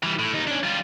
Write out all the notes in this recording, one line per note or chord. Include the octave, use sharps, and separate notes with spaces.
E3 G3
A2
D#2 D#4
C#4 D4
G3 F4